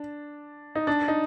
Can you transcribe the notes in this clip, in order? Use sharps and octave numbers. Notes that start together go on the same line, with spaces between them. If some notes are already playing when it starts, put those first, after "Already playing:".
Already playing: D4
D#4
D4
D#4